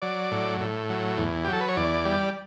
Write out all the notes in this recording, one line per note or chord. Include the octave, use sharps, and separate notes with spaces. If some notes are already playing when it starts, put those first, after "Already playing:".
F#3 D5
A2
A2
F#3
E2
G4
F#3 A4
B4
C#5
E2 D5
G3